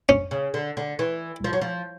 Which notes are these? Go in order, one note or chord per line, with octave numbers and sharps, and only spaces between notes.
C#4
C#3
D3
D3
E3
F3
F#3
F3